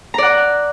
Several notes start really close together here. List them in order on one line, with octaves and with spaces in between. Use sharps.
A#5 D5 F#5